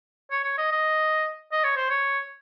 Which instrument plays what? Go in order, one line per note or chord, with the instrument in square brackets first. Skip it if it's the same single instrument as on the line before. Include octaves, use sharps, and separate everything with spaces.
[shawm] C#5
C#5
D#5
D#5
D#5
C#5
C5
C#5